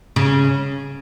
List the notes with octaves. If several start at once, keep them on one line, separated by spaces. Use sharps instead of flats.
C#3